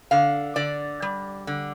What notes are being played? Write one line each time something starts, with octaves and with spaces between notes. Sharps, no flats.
D3 F5
D3 D5
G3
D3